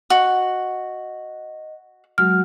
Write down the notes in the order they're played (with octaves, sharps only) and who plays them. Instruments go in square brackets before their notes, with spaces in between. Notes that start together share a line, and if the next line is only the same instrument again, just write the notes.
[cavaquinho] F#4 [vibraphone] D#5
[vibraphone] F#3 G#3 F#4 [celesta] F6